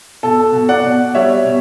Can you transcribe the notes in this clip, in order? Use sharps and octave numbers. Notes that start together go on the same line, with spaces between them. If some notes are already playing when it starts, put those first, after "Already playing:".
B2 A4
B2
D5 F#5
B2
G3 C#5 E5
B2